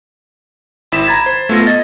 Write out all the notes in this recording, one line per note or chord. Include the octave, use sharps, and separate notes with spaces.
G#1 E4 B6 E7
A#5 B5 G#6 A6
C5
A3 B3 F4 A4 A#6
D#5 A6